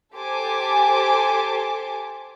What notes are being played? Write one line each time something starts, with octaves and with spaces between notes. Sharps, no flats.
G4 A4 C5 G#5 A5 D6